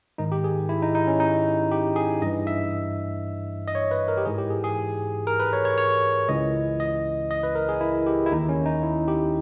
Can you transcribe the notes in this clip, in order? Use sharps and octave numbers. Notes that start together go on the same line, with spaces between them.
G#2 D#3 D#4
G4
G#4
E4
D#4
D#4
C#4
D#4
G4
G#4
G2 E3 D#5
E5
D#5
C#5
B4
A#4
G4
G#2 E3 G#4
G4
G#4
G#4
A#4
B4
C#5
C#5
C#5
C#2 C#3 E3 D#5
D#5
D#5
B4
A#4
G#4
E4
G4
E4
D#2 D#3 D#4
C#4
D#4
E4
G4